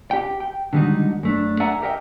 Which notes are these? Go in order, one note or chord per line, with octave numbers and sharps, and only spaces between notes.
G4 G5
G5
D3 D#3 G3 G#3 D#4 F#4
F#2 A3 D4
A4 D5 E5 F#5 G#5 A#5
G4 A4 A#4 D#5 E5 G5